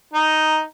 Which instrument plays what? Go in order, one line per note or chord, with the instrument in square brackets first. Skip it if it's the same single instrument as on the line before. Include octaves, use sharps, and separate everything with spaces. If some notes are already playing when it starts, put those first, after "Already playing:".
[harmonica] D#4